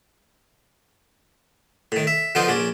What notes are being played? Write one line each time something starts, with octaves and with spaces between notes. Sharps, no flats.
A2 D#3
E5
D3 F3 B3 D#4 F4 C5
A#1 C#4 D4